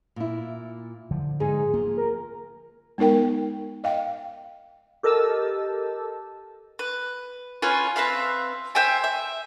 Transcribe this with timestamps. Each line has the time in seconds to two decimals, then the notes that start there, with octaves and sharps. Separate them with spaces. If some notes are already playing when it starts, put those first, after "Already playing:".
0.16 A#2 E4
1.11 D3 F3
1.40 G#2 D#4 G#4
1.74 F3 A#3
1.97 A#4
2.98 G#3 B3 D#4 A#4 G5
3.84 D#5 F5 G5
5.03 G4 A4 A#4 D#5 A5 E6
6.79 B4
7.62 C#4 F4 B4 G#5
7.96 C4 B4 E5 F5
8.75 C5 E5 G5 G#5
9.04 E5